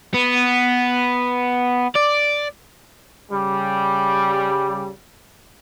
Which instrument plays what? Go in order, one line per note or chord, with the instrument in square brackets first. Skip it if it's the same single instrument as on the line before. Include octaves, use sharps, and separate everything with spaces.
[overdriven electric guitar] B3
D5
[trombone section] C#3 G3